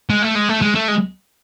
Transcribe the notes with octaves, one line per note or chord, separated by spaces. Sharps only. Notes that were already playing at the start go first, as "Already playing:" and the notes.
G#3
A3
G#3
A3
G#3
A3
G#3